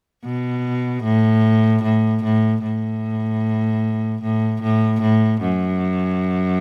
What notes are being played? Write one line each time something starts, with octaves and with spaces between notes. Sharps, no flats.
B2
A2
A2
A2
A2
A2
A2
A2
F#2